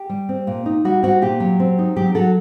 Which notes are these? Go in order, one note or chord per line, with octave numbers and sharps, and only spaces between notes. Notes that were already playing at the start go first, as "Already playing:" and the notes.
Already playing: G4
G3
C4
A#2
D#4
G3 F#4
C4 F#4
A#2 G4
F#3
C4
D#4
F#3 G4
F#3 F#4 A4